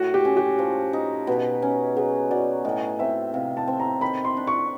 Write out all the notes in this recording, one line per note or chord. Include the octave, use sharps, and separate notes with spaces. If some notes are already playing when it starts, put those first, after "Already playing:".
Already playing: A2 F#4
G4
C#4
G4
F3
D#4
B2
C#4
F#3 G#4
F#3 D5
A2 D#5
C4 E5
C3 F5
A5
C4
A#5
D#3 B5
C6
D4
C#6